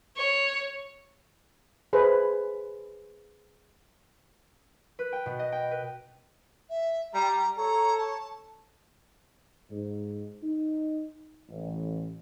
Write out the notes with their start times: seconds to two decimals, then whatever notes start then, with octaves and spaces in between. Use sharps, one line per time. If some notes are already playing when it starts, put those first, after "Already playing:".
0.16 C#5
1.93 G#4 B4 C5
4.99 B4
5.12 G5
5.26 B2
5.39 D#5
5.52 G5
5.71 B4
6.70 E5
7.14 G3 A#5
7.57 A4 C#5 A#5
7.98 A5
9.69 G#2
10.43 D#4
11.49 A1